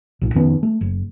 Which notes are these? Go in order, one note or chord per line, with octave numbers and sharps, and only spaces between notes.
B1 A#2
F2 D#3 B3 C#4
A3
F#1